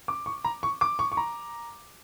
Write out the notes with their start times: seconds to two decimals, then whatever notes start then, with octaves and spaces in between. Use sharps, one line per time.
0.08 D6
0.26 C#6
0.44 A#5
0.63 C#6
0.81 D6
0.99 C#6
1.12 C#6
1.17 A#5